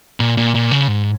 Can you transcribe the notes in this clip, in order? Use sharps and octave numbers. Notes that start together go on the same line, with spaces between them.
A#2
A#2
A#2
C#3
G#2